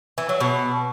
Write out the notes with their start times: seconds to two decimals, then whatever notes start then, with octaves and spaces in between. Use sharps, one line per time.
0.18 E3
0.29 F#3
0.40 B2